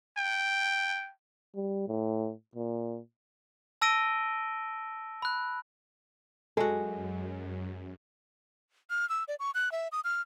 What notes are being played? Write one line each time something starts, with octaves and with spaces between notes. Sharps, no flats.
G5
G3
A2
A#2
A5 E6 A#6 D7 D#7 G7
B5 F#6
F#2 G#3 F#4 A4
F6
E6
D5
C#6
F#6
E5
D#6
F6